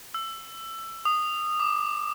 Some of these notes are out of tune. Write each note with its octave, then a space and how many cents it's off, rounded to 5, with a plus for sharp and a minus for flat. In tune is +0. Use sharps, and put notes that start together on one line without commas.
E6 +15
D#6 -15
D6 +15